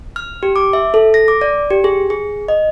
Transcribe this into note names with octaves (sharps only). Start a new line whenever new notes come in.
F6
G4
D6
E5
A4
A#6
D6
D5
G4
G#4
G#4
D#5